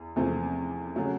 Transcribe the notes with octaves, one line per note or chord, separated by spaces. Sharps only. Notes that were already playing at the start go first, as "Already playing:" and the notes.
Already playing: E2
E2 C3 F3 A3 C4
C#3 F#3 A3